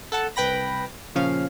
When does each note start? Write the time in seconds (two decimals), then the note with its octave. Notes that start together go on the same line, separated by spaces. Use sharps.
0.12 A4 F#5 A5
0.36 C2 B4 G5 B5 A#6
1.15 A#2 C#3 F3 C#4 F5